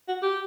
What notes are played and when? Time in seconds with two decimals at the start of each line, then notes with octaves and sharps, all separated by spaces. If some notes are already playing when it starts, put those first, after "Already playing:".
0.08 F#4
0.23 G4